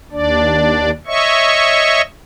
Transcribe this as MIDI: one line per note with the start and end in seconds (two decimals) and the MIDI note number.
0.12 0.91 39
0.12 0.91 62
0.12 0.91 74
1.07 2.02 73
1.07 2.02 75
1.07 2.02 76
1.07 2.02 85